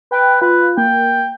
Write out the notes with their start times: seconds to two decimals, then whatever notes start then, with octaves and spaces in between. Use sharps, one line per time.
0.12 B4 G5
0.42 F4 B4
0.78 A#3 G5